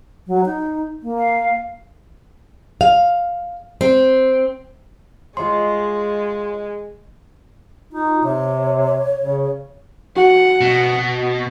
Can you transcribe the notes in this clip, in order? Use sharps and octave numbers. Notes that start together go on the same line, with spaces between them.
F#3
D#4
A#3
F5
F5
C4
G#3 F4 C#5 D#5 C6
D#4 F4
C3 C#5
C#3
F#4 F#5
B2